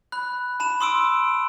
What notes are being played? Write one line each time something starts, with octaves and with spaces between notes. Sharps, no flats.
B5 F#6
A5 B5 E7
C6 D#6 E6 D7